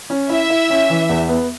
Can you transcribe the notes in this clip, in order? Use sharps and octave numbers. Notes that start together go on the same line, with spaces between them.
C#4
E4 E5
E4
C#4
E3
E2
B3